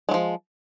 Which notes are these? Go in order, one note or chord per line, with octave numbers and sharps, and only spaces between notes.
F3 F#3 G#3